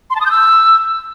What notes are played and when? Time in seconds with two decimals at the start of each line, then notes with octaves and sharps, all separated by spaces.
0.10 C6
0.15 A5
0.21 D#6
0.26 G6
0.31 E6